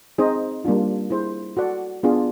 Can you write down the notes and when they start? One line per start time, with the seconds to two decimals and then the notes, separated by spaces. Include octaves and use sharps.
0.18 C4 D#4 G#4 C5 D#5
0.65 G3 A#3 D4 F4
1.10 E4 G#4 C5
1.57 F#4 A4 D5 F#5
2.03 B3 D4 F4 G#4